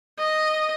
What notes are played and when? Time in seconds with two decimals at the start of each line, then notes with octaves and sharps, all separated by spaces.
0.19 D#5